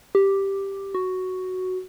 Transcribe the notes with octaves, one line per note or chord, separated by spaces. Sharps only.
G4
F#4